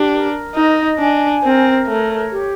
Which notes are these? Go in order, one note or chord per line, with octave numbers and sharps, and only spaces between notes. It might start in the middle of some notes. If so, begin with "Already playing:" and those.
Already playing: D4 G4
A#4
D#4 D#5
D4 G#5
C4 A#4
A3 C#5
G4